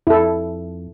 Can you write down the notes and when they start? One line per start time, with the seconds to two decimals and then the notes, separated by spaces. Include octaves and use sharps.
0.07 F2 E4 A4